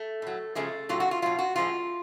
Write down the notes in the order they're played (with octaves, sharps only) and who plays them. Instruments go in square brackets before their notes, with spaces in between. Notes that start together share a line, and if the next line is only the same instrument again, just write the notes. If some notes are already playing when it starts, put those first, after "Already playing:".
Already playing: [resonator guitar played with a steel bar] A3
A2 F#3
C#3 F3 G#3 A3
A2 F#3 F4
F#4
F4
B2 F#3 F4
F#4
A2 F3 G#3 F4